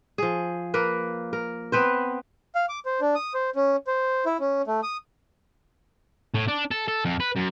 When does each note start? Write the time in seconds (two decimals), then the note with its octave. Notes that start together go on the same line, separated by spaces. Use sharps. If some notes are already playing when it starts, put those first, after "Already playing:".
0.18 F3 G#4
0.74 A#3 A#4 B4
1.33 A#4
1.72 B3 C4 B4 C5
2.55 F5
2.69 D6
2.86 C5
3.01 D4
3.15 D#6
3.34 C5
3.55 C#4
3.87 C5
4.26 E4
4.40 C#4
4.67 A3
4.83 D#6
6.34 A2
6.48 D4
6.71 A4
6.88 A4
7.05 F2
7.20 B4
7.36 F#2